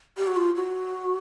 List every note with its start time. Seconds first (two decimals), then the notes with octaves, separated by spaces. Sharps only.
0.18 G4
0.27 F#4
0.36 F4
0.56 F#4